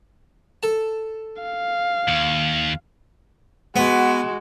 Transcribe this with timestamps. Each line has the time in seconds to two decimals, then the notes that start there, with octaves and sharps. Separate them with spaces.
0.63 A4 A5
1.42 F5
2.08 D#2
3.76 G#3 B3 F#4